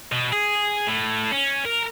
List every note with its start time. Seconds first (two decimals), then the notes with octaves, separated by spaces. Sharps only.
0.12 B2
0.32 G#4
0.87 A2
1.32 C#4
1.65 A#4